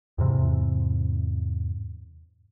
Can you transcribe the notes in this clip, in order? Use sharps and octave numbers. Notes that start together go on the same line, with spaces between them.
E2 G#2 C3 E3